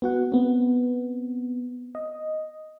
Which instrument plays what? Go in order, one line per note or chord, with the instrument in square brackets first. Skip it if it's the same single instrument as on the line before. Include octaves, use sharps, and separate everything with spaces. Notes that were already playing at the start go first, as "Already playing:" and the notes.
[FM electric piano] B3 F#4 F#5
B3 C4
D#5